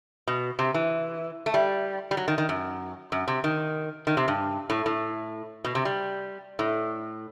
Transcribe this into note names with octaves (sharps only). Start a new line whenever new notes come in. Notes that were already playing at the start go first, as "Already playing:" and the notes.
B2
C3
E3
A3
G3
G3
F#3
D#3
D#3
F#2
F#2
C3
D#3
D#3
C3
G2
A2
A2
B2
C3
G3
A2